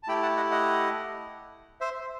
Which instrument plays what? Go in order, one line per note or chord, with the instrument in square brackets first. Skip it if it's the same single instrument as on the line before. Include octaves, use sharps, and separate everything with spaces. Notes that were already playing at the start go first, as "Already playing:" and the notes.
[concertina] A5
A3 E4 G4 G5 B5
F#5 A5
D#5 F#5
D#5 F#5
C5 E5